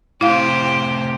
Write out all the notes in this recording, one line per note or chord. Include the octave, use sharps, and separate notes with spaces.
A2 C3 E4 G4 C5 F5